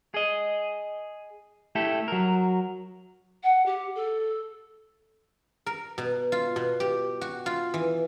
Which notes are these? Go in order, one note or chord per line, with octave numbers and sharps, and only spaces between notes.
G#4 D#5
A3 E4 G4 A4
F#3 A#4
F#5
G4
A4
A#4
B2
F4
B2
G4
F#4
F4
E3